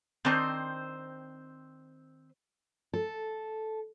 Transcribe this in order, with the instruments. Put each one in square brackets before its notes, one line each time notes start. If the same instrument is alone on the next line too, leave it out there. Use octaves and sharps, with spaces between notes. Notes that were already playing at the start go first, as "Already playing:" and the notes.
[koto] D#3 D4 D#4 [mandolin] C4 C5
[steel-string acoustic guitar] A4